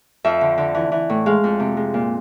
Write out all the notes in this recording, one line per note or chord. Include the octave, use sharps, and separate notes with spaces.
F2 E5
D3
D3
E3
E3
A2
G#3 F5
F2
C3
G#3
A#2